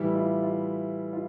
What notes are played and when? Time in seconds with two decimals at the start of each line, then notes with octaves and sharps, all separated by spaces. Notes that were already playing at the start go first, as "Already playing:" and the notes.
Already playing: A2 E3 G3 E4 G4
0.15 F4
0.43 F4
1.13 F4